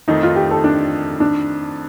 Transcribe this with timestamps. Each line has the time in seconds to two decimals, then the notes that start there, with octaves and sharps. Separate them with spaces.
0.08 F2 D#3 A3 D#4
0.23 F4
0.36 G4
0.51 A4
0.64 D4
1.20 D4